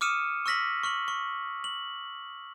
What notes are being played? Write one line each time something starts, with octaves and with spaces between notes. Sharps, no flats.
D6 D#6 F6 C#7 D#7 E7
C#6 E6 F6 A#6 B6 F#7
C#6 F6 F#7
C#6
F#7